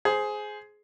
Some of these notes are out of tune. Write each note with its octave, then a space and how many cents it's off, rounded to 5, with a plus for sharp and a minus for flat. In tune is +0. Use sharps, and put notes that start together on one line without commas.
G#4 +15 C5 +0